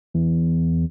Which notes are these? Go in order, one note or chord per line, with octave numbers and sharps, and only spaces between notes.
E2